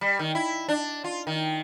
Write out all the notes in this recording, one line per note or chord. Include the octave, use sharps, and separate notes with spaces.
G3
D#3
E4
D4
F4
D#3